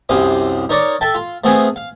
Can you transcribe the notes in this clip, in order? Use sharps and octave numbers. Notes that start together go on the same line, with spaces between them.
C2 F#2 C4 F5 D#6
D#4 A#4 C#5 D5 A#5 C#6
A4 E5 G5 A5
F4
A3 B3 C4 G#4 F5 G#5
F5